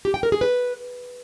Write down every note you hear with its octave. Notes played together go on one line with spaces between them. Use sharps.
G4
G5
A#4
G#4
B4